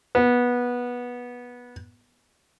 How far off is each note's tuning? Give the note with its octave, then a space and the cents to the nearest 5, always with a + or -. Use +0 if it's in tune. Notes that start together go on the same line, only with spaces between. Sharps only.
B3 -15